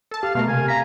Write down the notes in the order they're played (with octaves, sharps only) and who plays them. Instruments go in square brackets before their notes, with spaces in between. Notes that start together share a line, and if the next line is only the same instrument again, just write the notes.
[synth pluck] A4 A5
[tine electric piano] G4 [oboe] F5
[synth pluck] B2 A3 A#4 [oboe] F5
[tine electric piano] C3 [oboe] G#5
[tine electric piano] F5 B6 [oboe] A#5